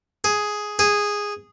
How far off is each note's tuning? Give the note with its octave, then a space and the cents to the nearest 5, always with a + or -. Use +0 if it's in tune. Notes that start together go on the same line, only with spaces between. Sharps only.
G#4 +5
G#4 -10